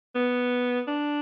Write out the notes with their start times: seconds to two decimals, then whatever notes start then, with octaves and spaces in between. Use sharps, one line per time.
0.15 B3
0.88 D4